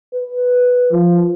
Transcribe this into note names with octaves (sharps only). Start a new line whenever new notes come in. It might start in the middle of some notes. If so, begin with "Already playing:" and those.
B4
F3